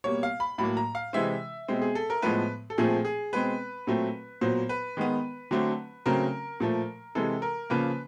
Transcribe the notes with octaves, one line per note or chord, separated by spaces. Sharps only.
B2 G3 A#3 C#5
F5
B5
A2 F#3 A#3 B5
A#5
F5
C3 E3 G#3 C4 E5
B2 G#3 C4
G#4
A4
A#4
A2 F3 G#3 B3 B4
A4
A#2 F3 A3 C4 G#4
G#4
B2 G#3 C4 B4
A#2 F#3 A3 C4
A#2 F#3 B3 C5
B4
D#3 G#3 B3
D3 F#3 A3 C4
C#3 F#3 A3 C4 A#4
A#2 F3 A3
C3 E3 G#3 A4
A#4
C#3 F3 A#3 B4